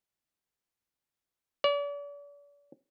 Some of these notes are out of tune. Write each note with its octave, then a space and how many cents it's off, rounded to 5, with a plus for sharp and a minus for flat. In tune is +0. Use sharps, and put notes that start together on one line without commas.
D5 -40